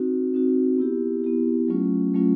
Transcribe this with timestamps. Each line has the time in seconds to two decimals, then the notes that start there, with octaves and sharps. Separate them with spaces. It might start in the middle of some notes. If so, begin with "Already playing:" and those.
Already playing: C4 D#4 F#4
0.34 C4 D#4 F#4
0.78 B3 E4 G4
1.24 B3 E4 G4
1.68 F#3 A3 C#4 F4
2.14 F#3 A3 C#4 F4